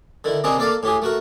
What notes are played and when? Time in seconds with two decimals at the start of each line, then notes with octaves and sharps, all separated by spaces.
0.24 D3 D#3 E4
0.44 C3 D#3 C4 D4 D#4 G#4
0.59 A#3 A4 D5 F5
0.83 A2 G4 G#4
1.02 A3 F#4 A#4